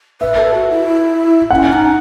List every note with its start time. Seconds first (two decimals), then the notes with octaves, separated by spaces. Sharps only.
0.21 B4 E5
0.37 A4
0.53 F#4
0.70 E4
1.51 C#4 F#5
1.72 D#4